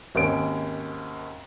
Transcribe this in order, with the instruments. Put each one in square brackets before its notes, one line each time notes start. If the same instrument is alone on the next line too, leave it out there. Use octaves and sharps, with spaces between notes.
[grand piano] G#1 D#2 C#4 D7